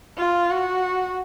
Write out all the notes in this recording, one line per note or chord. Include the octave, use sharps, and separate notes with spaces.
F4
F#4